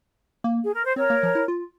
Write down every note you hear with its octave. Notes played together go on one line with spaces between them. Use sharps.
A#3
G#4
A#4
C5
C4 A#4 C#5
A#3
F3
E4
F4